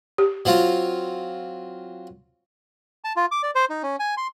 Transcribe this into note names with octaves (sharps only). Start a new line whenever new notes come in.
G4
F#3 C4 F4
A5
F4
D6
D5
C5
D#4
C#4
G#5
C6